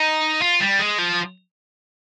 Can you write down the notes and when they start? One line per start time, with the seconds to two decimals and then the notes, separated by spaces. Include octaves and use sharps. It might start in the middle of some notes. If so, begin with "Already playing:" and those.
Already playing: D#4
0.41 F4
0.60 G3
0.79 G#3
0.98 F3